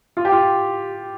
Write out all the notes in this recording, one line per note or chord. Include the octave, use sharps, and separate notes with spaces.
F4
G4
F4